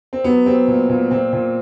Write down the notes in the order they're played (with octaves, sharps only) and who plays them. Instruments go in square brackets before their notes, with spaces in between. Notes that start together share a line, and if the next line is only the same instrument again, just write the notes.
[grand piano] C4
F#3 B3
F#3 C4
A#2
A#2
A#2 C4
A#2